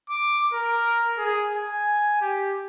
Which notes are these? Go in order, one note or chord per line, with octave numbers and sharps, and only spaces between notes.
D6
A#4
G#4
G#5
G4